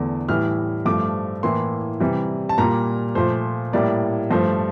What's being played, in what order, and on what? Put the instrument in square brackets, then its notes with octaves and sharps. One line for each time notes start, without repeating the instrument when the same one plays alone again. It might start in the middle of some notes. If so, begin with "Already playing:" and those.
Already playing: [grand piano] E2 D3 A3
A2 E3 G3 F6
G2 F3 A3 D6
A2 E3 A#3 C6
C3 E3 G3
A5
A#2 G3 A#3 A#5
A#2 F3 A3 C5
A2 G3 A#3 D5
G2 F3 A3 C5